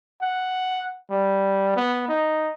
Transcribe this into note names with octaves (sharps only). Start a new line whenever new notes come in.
F#5
G3
B3
D#4